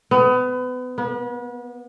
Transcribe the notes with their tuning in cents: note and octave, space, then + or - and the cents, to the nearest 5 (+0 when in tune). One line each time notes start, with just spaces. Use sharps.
B3 +30
B3 -35